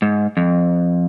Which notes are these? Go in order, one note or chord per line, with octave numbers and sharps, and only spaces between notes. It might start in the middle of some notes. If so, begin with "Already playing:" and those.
G#2
F2